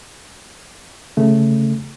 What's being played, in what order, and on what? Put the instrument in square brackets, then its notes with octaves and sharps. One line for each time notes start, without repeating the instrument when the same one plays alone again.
[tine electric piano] C#3 A3